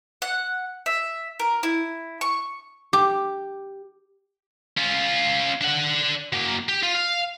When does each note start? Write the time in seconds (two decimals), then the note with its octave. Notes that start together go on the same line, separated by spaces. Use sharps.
0.22 F#5
0.86 E5
1.39 A#4
1.63 E4
2.21 C#6
2.93 G4 D6
4.77 C#4 F4
5.61 D4 F#5
6.33 F#3 A#3
6.69 G4
6.83 F4
6.94 F5